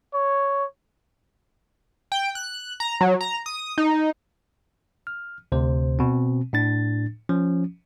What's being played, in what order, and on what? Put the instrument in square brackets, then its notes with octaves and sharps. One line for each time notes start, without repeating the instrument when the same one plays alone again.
[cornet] C#5
[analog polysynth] G5
F#6
A#5
F#3
A#5
D#6
D#4
[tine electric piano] F6
D2 C3 C5
B2 C4
A2 D4 A6
F3 C#4